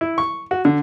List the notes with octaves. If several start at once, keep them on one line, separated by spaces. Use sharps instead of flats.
E4
C#6
F#4
D3